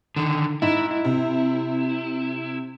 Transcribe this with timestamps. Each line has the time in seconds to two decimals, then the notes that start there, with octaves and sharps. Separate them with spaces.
0.16 D3 D#3
0.62 G#2 E4
0.91 E4
1.05 C3